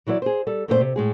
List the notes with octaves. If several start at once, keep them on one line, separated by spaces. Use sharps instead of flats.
E3 F#3 E4 C5 D5
G#4 C5
G3 A4
F#2 A#2 A3 C4 G4 C5
C3
A2 G#3 G#4